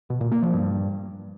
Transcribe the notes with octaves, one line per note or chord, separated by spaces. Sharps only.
B2
A#2
A#3
F3
G2